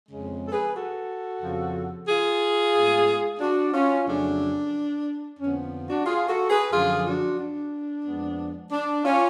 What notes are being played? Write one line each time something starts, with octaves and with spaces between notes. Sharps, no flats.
F2 C#3 G#3
A4
G#4 B4
F#4 A4
F2 C#3 F3
F4 G#4
A2 G#3 B3
D4 F#4
C#4 F4
F2 C#3 F#3 A3 C#4 D4
F2 D3 F3 B3 C#4
D4 F#4
F4 G#4
F#4 A4
G#4 B4
F#2 D3 F3 F4 G#4
D4 F#4
D4
F2 F3 G#3 B3
D4
C#4 F4